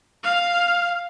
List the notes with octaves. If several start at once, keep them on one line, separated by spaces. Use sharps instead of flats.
F5